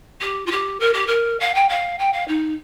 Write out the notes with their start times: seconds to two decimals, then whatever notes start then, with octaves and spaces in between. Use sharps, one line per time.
0.20 G4
0.45 F4
0.51 G4
0.79 A#4
0.93 G4
1.07 A#4
1.39 F5
1.54 G5
1.68 F5
1.99 G5
2.12 F5
2.27 D#4